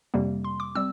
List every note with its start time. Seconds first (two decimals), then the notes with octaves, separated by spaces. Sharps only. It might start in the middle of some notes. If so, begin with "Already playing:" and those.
0.14 F2 C3 G3 A#3
0.44 C6
0.60 D6
0.75 G3 C4 E6